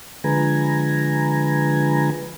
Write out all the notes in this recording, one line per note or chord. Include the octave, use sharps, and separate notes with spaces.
D3 F3 G#3 B4 G#5 A#5